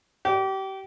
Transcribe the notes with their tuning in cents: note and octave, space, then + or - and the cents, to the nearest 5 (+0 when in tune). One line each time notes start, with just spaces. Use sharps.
G4 -30